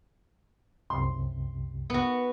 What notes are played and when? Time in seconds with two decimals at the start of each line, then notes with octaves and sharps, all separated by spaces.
0.90 C2 F#2 C3 C6
1.90 B3 F#4